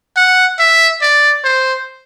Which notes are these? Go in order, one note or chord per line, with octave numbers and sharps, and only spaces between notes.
F#5
E5
D5
C5